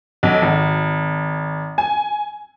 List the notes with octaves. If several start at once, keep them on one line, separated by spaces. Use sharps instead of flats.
B1
G#1
G#5